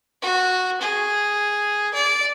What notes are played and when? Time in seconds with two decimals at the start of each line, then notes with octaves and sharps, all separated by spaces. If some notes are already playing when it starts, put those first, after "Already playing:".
0.22 F#4
0.81 G#4
1.94 D5